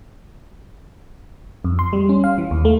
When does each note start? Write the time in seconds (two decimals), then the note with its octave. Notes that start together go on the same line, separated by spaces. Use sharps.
1.64 F2
1.79 C6
1.93 G3
2.09 C#4
2.24 F5
2.38 E3
2.51 D#2
2.65 A3